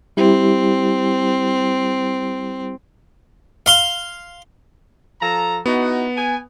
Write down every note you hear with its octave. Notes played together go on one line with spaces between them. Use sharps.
G3 C4 E4 G4
F5 C6
F3 A4 A#5
B3 D#4 E4 F#4
G#5